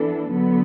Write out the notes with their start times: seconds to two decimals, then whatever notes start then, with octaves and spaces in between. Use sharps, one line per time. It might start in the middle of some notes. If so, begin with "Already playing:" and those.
Already playing: E3 B3 D4 A4
0.29 D3 F#3 B3